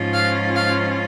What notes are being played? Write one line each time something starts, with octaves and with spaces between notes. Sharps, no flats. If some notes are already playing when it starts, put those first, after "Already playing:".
Already playing: G#2 F3 C#4 F4
F5
F5